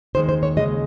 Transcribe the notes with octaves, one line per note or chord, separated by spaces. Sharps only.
D#2 D#3 G#3 C5
C5
C#5
D#2 C#3 G#3 D#5